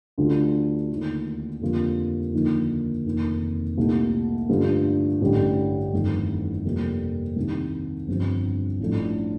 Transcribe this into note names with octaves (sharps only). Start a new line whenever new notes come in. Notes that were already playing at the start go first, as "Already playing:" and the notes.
D2 D3 G3 D4 F4
D#2 D3 A3
F2 D3 G3 A#3 F4
D#2 D3 F3 A#3 D#4
F1 F2 D#3 A#3
C2 A#2 A3 D#4
G2 D3 A3 D4 F4
A1 G2 D3 G3
G1 F2 D#3 A3
F2 C3 G3 A#3
C2 C3 D#3
G1 G2 F3 C4
A1 A2 F3 A3 D4